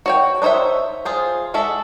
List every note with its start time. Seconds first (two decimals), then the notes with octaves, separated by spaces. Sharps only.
0.06 F#4 C#5 G5
0.42 D4 D#4 C5 C#5 E5
1.05 F4 G#4 C5
1.54 G#3 F#4 A4 E5